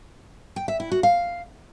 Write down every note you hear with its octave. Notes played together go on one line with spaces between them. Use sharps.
G5
E5
E4
F#4
F5